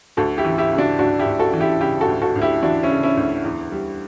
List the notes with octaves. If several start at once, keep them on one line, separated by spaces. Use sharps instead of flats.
D2 F#4 A4
E4 G4
E3
E4 G4
C#3
D4 F#4
D2 D4 F#4
E4 G4
D2
F#4 A4
E3
E4 G4
C#3 E4 G4
F#4 A4
D2
F#4 A4
D2
E4 G4
E3 D4 F#4
C#4 E4
C#3
C#4 E4
D2
E2
G3